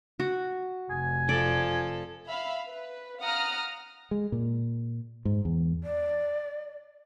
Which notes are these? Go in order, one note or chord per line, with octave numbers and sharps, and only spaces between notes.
F#4
F1 G#5
F3 A4 D5
E5 F5 B5
B4
F5 F#5 A#5 D#6 F6
G#3
A#2
G#2
E2
D5